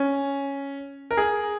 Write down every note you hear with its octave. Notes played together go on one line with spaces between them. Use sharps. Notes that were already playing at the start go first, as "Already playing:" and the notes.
Already playing: C#4
A#4
G#4